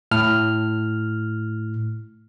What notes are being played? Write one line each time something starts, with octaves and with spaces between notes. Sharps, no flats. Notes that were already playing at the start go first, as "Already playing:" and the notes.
A2 F6